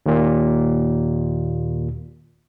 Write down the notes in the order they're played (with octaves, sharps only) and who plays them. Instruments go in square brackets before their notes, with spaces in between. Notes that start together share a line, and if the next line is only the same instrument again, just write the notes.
[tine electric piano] D#2 A#2